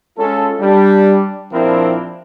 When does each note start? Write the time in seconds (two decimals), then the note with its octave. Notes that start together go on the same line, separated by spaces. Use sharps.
0.18 G#3 C#4 F4 A4
0.60 G3 D4
1.52 A#1 F3 C4 D4 E4 A#4